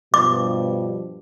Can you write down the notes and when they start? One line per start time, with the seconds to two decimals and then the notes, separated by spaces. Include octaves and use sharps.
0.14 G2 B2 F3 D6